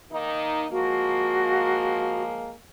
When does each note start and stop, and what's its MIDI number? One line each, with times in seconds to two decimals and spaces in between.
0.11 0.64 51
0.11 0.64 58
0.11 0.64 63
0.71 2.53 53
0.71 2.53 56
0.71 2.53 58
0.71 2.22 66